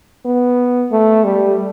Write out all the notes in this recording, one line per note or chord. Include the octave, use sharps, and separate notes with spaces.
B3
A3
G3